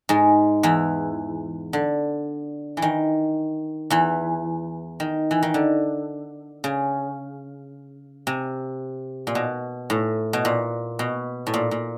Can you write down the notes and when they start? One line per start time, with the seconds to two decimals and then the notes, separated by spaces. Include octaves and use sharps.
0.09 G#2 G#3
0.63 E2 E3
1.73 D3
2.77 E3
2.82 D#3
3.90 E2 E3
5.00 D#3
5.31 E3
5.43 D#3
5.54 D3
6.64 C#3
8.27 C3
9.27 A#2
9.35 B2
9.90 A2
10.33 B2
10.45 A#2
10.99 B2
11.47 A2
11.54 A#2
11.71 A#2